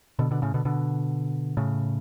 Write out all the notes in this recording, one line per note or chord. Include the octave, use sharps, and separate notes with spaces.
B2 D3
B2 D3
A2 C#3
B2 D3
B2 D3
A2 C#3